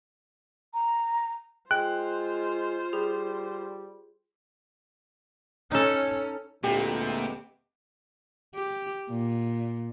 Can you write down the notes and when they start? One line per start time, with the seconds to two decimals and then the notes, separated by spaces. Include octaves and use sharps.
0.74 A#5
1.71 G#3 F4 C5 G5 F#6
2.93 G3 G#4
5.71 C#4 D#4 A4
6.63 D2 A#2 G#3 B3 C4 G4
8.55 G4
9.10 A#2